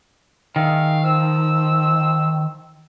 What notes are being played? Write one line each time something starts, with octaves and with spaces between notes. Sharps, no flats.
D#3 G#4 E5 F5
F3 E6